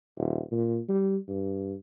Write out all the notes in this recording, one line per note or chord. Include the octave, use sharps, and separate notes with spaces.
D#1
A#2
G3
G2